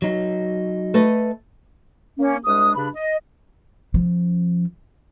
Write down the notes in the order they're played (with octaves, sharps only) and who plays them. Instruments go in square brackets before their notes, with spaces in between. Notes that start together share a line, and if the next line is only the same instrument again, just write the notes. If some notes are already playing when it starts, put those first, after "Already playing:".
[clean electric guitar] F#3 D#4
[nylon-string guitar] A3 B4 D#5
[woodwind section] A#3 C#4
C2 G#3 D4 D#6
G2 C#3 D4 B5
D#5
[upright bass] F3 C#4